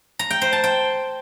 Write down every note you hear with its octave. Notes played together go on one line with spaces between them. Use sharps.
A#5
G5
C5
A5
G5